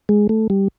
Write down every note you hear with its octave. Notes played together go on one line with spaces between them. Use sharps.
G#3
A3
G3